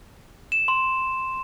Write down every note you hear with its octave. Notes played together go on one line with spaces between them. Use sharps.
E7
C6